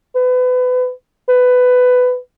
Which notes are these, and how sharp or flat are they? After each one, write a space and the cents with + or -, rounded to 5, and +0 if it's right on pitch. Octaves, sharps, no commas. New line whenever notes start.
B4 +30
B4 +15